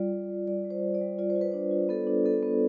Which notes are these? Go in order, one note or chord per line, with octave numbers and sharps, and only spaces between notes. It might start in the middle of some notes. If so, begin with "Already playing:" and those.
Already playing: G3 F4 D5
G3
G3
G3 D5
G3
C5
G3
D5
G3
F4 D5
C5
F4
B4
D4 C5
F4
B3 A4
D4
B3 A4
B3